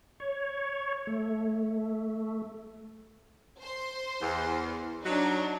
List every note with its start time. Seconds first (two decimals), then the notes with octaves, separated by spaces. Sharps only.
0.20 C#5
1.07 A3
3.60 C5 C6
4.21 E2
5.04 F#3 D4 D#4